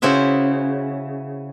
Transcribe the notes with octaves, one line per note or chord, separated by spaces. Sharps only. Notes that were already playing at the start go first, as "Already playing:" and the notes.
C#3 E4 F#4 C5 E5